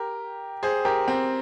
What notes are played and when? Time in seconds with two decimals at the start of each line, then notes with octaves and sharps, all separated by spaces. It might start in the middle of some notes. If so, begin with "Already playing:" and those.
Already playing: G4 A#4
0.63 G#4 C5
0.85 G4 A#4
1.08 C4